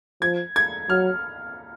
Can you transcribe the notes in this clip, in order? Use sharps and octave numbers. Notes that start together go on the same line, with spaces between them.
F3 G#6
G#6
F#3 F6